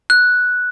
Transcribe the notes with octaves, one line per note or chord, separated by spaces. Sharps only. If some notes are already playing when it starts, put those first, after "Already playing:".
F#6